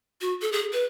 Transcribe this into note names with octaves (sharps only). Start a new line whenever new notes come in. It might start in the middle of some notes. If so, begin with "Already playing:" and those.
F#4
A4
G#4
B4